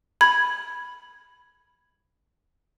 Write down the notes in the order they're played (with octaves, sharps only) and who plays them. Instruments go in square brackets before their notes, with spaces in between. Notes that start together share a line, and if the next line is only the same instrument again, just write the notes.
[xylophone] B5 G#6